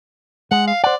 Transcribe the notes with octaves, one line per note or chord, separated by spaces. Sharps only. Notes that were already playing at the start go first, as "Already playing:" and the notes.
G#3 F#5
F5
C5 D5 F#5